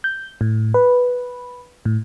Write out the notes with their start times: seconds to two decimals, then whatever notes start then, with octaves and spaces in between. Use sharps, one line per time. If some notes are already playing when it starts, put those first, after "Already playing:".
0.04 G6
0.41 A2
0.74 B4
1.85 A2